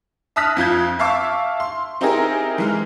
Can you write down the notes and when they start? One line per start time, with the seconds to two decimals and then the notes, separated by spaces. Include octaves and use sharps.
0.36 E5 A5 D#6 F6 F#6 B6
0.57 F2 F4 G6 G#6
0.99 E5 F5 A5 C#6 D6 E6
1.60 C6
2.01 C4 D#4 E4 G4 G#4 A#4
2.58 E3 G#3 F6